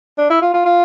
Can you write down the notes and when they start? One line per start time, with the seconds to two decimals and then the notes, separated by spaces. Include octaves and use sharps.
0.18 D4
0.30 E4
0.42 F4
0.54 F4
0.65 F4